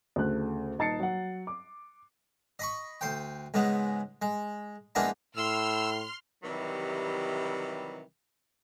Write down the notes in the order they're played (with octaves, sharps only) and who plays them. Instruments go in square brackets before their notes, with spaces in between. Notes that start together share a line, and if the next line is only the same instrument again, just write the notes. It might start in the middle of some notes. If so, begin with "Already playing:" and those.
[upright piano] D2 C#3 A3 F#6
D#1 D#4 A5 A6 C7 C#7
F#3 F#5
D6
[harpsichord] D#5 B5 C#6
D2 C5 G5
C#2 G#2 G#3 B3
G#3
F3 G#3 A#3 B3 D4 E4
[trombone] A2 [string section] C6 F6 [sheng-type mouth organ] E6
[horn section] C3 D#3 E3 F#3 G3